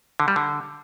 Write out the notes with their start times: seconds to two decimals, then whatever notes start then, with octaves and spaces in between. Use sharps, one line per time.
0.20 D3
0.28 G3
0.36 D3